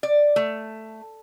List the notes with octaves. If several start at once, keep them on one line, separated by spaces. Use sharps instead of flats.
D5
A3